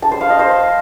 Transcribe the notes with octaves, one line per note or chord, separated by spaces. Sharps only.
A5
C5
F5
D#5
C5